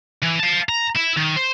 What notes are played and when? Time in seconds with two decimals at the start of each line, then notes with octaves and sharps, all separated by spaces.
0.23 E3
0.40 F5 A5
0.69 A#5
0.95 E4 E5
1.17 D#3
1.36 C5